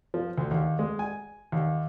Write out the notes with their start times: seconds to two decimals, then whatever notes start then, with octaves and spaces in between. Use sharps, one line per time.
0.14 F3
0.38 D2
0.51 D#2
0.79 G#3
0.99 G#5
1.52 D#2